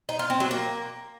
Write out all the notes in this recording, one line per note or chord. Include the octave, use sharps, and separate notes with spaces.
D#4
F4
C4
F#3
A#3